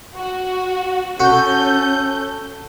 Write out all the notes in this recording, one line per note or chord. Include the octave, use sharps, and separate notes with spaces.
F#4
C#4 F#4 A4 G6